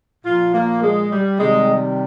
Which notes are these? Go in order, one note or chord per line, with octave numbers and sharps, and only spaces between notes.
A#2 F3 F4
A#3
G#3
G3
C3 D#3 G3 G#3